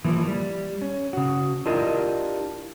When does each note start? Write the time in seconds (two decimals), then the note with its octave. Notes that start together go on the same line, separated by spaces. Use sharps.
0.04 E3 F3 A#3 E4
0.27 G3
0.82 C#4
1.13 C#3 F#4
1.66 D4 E4 F4 G4 A#4 D#5